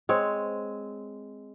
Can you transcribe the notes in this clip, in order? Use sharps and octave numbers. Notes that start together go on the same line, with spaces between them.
G#3 C4 C#5